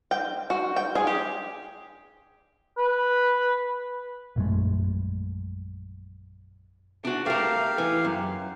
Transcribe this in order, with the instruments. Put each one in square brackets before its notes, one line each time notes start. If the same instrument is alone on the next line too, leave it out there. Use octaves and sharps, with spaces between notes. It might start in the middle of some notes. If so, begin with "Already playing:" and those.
[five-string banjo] G5
F#4
G5
G#4
G4
[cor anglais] B4
[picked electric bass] A#1 F#2 G#3 A3
[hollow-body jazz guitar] D4 F#4
[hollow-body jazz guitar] A3 A#4 [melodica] G4 F5
[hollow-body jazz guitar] E3
F#2